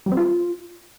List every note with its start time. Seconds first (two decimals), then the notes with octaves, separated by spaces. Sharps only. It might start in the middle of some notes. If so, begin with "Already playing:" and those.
0.06 G3
0.12 C4
0.17 F4